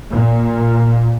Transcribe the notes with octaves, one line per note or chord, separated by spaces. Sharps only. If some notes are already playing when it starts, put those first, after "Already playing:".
A#2